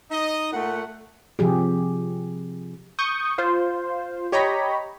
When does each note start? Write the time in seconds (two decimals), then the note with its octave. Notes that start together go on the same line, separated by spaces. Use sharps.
0.11 D#4 D#5
0.53 A#2 A3 F#5
1.39 C3 F3 G4 G#4
2.99 C#6 D#6 G6
3.38 F4 C5
4.32 G4 C#5 D#5 A#5 B5